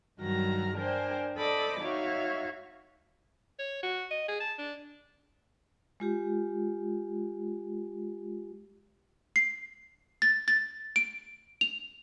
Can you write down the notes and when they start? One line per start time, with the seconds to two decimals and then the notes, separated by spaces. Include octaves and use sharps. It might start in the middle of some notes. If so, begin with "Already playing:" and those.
0.19 G2 D#3 F#3 F#4 A#5 F6
0.76 D4 A#4 C5 G5 G#5
1.37 A4 C5 D5 D#5 B5 D6
1.80 D#4 F#4 C#5 E5 F5
3.59 C#5
3.83 F#4
4.11 D#5
4.28 G#4
4.40 A5
4.58 D4
6.00 G#3 F4 G4
9.36 C7
10.22 A6
10.48 A6
10.96 D7
11.61 F7